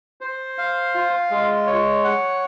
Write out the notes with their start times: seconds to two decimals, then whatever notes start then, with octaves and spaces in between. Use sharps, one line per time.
0.21 C5
0.58 F5
0.94 F4
1.31 G#3
1.67 C#5
2.04 F#5